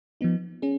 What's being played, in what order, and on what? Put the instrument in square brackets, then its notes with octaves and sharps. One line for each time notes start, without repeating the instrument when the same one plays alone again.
[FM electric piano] F3 B3 D#4
C#4 G#4